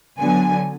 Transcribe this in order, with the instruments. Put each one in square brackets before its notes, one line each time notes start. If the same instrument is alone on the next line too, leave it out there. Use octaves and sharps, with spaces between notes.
[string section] D3 F#3 B3 G#5